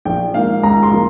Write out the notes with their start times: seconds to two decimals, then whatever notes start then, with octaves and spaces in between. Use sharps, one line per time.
0.05 A#1 G5
0.34 G#2 D#3 A#3 F5
0.63 C#2 A#5
0.83 C6
0.93 C#3 F3 A#3